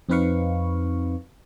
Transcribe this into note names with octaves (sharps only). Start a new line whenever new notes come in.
F2 C4 D#4 B4 F5 C#6